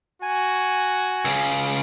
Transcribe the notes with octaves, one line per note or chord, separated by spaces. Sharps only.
F#4 G#5
C#2 C#3